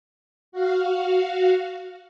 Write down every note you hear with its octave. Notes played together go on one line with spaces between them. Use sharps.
F#4 F5